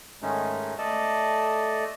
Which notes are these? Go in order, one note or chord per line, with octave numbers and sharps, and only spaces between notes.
G#2 D#3 G#3 A3 C#4 D#4
A3 A4 D5 D#5 A5